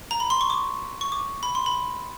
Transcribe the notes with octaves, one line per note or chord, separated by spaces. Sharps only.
A#5
B5
C6
C#6
D6
C#6
D6
B5
C6
B5